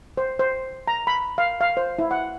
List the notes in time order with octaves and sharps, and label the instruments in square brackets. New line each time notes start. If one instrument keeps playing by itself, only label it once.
[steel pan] C5
C5
A#5
B5
F5
F5
C5
E4
F#5